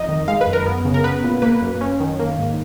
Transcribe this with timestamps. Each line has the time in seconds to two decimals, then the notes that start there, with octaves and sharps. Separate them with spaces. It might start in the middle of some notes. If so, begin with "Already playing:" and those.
Already playing: F2 D#4 D#5
0.09 D#3
0.28 G#3 F5
0.41 B4
0.47 F#2
0.53 A#4
0.66 B3
0.85 C#3
0.94 A#4
1.04 B3 B4
1.23 A#2
1.42 A#3 B4
1.62 F#2
1.81 C#4
2.00 D#3
2.19 A#3
2.38 G#2